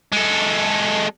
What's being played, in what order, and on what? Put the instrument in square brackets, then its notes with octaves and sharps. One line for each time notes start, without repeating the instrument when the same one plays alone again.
[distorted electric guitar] G#3 A4